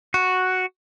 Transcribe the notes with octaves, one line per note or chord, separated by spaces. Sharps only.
F#4